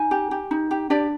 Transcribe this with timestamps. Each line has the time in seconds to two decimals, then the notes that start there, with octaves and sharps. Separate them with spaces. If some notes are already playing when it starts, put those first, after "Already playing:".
Already playing: D#4 G#5
0.11 G4
0.31 G4
0.51 D#4
0.71 G4
0.90 D4 G4 D5